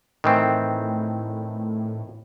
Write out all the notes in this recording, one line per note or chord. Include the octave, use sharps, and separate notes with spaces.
A2 D#3 E3 C4